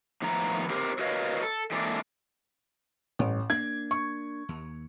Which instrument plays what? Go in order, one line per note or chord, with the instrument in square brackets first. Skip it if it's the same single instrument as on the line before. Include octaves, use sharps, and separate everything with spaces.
[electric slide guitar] A2 D#3 F3 B3 A#5
C4 G4 A#4 C5 A#5
F#4 A#4 B4 C#5 D#5 F5
A4
E3 G#3 A#3 C4 D4 A4
[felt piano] A1 [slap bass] G2
[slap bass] A#3 D4 [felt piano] G#6
[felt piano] C#6
[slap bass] D#2